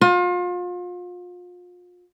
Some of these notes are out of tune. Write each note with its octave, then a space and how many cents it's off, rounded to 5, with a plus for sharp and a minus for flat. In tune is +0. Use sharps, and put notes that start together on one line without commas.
F4 +35